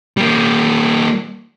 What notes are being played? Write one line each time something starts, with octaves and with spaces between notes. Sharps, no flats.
G3 A#3